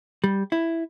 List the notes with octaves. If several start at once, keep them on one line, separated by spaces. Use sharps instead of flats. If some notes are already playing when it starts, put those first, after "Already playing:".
G3
E4